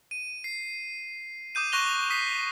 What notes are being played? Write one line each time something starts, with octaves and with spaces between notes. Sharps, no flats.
D#7
C7
D6 D#6 G6 D#7
C#6 F#6 A#6 F7 G7
D#6 B6 C7